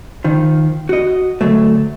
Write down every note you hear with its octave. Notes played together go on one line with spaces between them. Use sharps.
D#3 F3
F#4 D#5
D2 F#3 A3